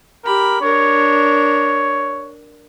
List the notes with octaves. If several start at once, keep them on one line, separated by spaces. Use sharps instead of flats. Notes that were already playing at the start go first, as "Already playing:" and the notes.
G4 A#4 B5
D4 A#4 C#5